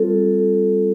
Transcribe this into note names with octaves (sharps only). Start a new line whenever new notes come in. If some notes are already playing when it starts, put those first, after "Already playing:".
Already playing: G3 C4 F4 A4